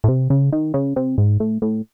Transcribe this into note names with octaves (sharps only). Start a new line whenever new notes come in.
A2
C3
C#3
D#3
C#3
C3
G#2
A2
A2